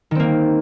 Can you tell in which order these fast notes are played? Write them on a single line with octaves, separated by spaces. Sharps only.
D#3 C4 A#3